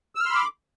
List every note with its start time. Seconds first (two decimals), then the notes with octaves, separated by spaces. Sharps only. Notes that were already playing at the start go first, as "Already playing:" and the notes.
0.15 E6
0.20 F6
0.25 C6
0.30 B5
0.35 D6